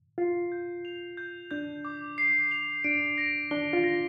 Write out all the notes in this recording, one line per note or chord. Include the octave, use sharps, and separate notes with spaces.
F4 C7
G6
F7
G6
D4 G6
D6
C7
F7
D4 D7
A#6
D4 G7
F4
A#6